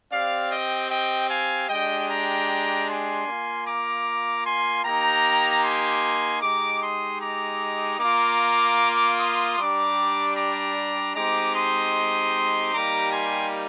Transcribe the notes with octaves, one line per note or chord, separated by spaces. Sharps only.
C4 G4 D5 F5
D#5 G5
D#5 G5
F5 G#5
G#3 D4 G4 D#5 G5
G5 A#5
G#5 C6
A#3 F4
A#5 D6
G#5 C6
A#3 D#4 G4 G5 A#5
G#5 C6
G#3 D#4 G4 A#5 D6
C6 D#6
A#5 D6
A#3 F4 A#5 D6
C6 D#6
G3 D4 G4 A#5 D6
A#5 D6
G#3 C4 D#4 G4 A#5 D6
C6 D#6
G3 A#3 D#4 G4 A#5 D6
G#5 C6